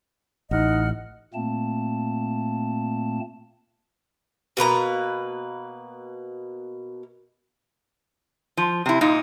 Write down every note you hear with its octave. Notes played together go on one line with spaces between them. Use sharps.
A1 D#4 D#5 F#5 F6
A#2 A3 A#3 C4 A5
B2 A#3 B4 A#5
F3
C3 E4
A#2 D#4